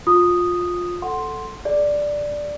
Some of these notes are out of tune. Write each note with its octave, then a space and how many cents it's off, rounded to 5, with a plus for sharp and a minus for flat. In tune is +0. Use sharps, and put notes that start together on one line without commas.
F4 +20 D#6 -5
A4 +0 F#5 +0 C6 +0
G#4 +35 D5 +0